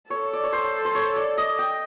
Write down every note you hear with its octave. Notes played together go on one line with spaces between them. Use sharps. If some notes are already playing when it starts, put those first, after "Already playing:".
A4 C#5
D5
C#5
C5
C5
C#5
D5
D#5
G5